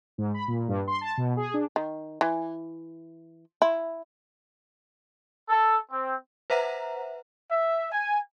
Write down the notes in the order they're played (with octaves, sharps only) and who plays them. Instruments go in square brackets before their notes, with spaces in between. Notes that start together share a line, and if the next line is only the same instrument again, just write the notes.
[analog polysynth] G#2
B5
A#2
G2
C6
A5
B2
G#4
D4
[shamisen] D#3
E3
E4
[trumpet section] A4
C4
[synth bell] B4 C5 E5 F#5 A#5
[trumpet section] E5
G#5